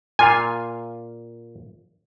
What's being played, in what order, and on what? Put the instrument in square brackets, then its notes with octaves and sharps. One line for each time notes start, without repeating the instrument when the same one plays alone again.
[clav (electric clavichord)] A#2 F4 F5 [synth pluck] G#5